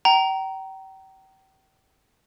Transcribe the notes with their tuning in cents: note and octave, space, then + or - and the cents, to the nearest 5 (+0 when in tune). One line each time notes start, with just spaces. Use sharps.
G5 -35 A#5 +0